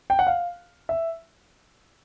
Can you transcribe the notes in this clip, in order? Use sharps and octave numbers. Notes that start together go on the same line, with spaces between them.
G5
F#5
F5
E5